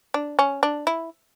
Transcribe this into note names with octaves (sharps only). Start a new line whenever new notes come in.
D4
C#4
D4
E4